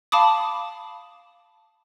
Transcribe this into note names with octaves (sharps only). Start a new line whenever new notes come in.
F5 A5 B5 D6 D#6